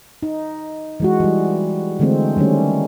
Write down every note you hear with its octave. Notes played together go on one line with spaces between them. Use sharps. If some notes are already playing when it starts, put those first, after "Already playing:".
D#4
E3 G#3 F#4
E3 G3
D3 E3 G#3 A3 C4
D#3 G3 A3 C#4